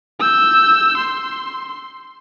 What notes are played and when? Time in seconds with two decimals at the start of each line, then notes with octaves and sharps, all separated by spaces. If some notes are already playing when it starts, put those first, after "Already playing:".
0.20 E6 G6
0.97 C6